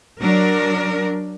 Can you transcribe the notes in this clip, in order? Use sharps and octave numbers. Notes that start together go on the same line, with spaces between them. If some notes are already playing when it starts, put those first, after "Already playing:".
F#3 D4 A#4